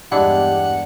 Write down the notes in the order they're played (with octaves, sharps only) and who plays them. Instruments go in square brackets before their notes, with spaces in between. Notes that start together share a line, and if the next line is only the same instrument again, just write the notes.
[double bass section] E2 G2 [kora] G#3 D4 E4 [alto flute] G4 [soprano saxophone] F#5